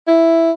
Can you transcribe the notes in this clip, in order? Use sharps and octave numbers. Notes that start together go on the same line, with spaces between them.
E4